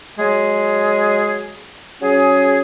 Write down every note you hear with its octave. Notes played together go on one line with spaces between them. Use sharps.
F#3 G#3 G#4
F#3 C#4 G#4